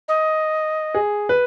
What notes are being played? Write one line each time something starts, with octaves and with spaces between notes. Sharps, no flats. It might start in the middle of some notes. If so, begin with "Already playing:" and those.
D#5
G#4
B4